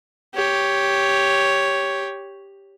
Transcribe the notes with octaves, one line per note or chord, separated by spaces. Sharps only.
G4 C#5